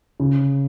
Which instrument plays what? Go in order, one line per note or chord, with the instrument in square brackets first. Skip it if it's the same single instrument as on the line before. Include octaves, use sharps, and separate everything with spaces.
[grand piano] C#3